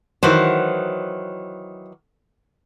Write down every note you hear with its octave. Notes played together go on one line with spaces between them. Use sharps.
D#3 E3 F#3 C5